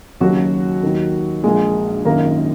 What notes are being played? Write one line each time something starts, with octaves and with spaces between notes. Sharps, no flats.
D#2 F#3 F#4
C#3
D#2 D#3
A#1 A#2 G#3 G#4
G#1 F#2 D#3 A#3 A#4